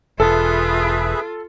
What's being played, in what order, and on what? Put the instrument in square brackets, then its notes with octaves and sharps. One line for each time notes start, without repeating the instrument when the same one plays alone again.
[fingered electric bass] E1 [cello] F4 [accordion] G#4 B4 E5 [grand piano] A4